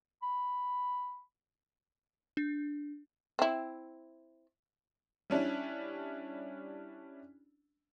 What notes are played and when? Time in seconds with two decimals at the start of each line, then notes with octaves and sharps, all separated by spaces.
0.22 B5
2.37 D4
3.39 C4 E4
5.30 G3 C#4 D4 E4